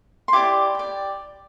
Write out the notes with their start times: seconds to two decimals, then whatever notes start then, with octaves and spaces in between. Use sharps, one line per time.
0.28 C6
0.33 E4 G4 D5 D6
0.75 G4 D5